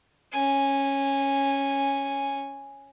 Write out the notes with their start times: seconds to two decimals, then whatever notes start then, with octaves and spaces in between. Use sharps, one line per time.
0.33 C#4 G#5